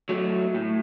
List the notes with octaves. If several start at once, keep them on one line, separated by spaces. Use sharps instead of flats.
F#3 A3
A2